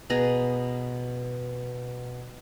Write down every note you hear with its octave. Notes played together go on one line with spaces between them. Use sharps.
B2 G#4 A#5